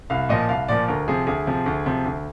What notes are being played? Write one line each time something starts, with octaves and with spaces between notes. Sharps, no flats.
C2 F5
A#2 F3 D#5
C2 F5
A#2 F3 D5
D2 A#4
C3 F3 G#4
D2 G#4
C3 F3
D2
C3 F3
D2